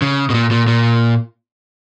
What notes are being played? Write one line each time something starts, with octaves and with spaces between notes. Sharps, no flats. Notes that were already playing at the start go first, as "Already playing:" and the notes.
C#3
B2
A#2
A#2
A#2